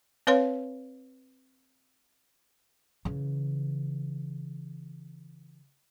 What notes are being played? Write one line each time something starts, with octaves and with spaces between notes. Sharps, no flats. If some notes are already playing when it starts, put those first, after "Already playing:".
C4 B4 C#5 F5 C6
C#3 E3